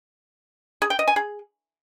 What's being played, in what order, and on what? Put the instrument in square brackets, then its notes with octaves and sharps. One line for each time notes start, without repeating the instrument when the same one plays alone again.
[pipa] G#4
G5
D#5
G#5
G#4